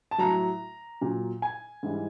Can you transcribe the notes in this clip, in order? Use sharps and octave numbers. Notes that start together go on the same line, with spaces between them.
A5
A2 F#3 A#5
A#2 F#3
G#5
G#2 E3 G3